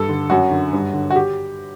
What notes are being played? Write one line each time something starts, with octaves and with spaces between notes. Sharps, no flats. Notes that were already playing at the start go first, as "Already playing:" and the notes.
Already playing: G2 A4
D3
F#2 F#4
D3
G2
D3
F#4
G4